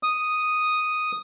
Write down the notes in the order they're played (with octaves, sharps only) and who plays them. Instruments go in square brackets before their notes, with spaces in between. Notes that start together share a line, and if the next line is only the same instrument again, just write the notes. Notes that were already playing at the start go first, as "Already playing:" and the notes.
[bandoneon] D#6